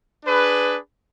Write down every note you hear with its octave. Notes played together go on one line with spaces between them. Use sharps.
D4 G#4 B4